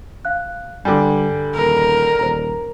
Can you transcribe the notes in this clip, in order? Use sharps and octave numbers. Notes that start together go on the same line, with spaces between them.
F5 F#6
G2 D3 G3 G#5 D6
D#1 A#4
D#1 C5 A#5